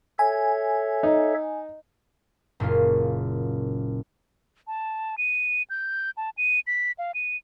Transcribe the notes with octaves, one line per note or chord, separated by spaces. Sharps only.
A4 C#5 E5 G#5
D#4
F#1 A#2 C#4 F4
A5
D#7
G6
A5
D#7
B6
F5
D#7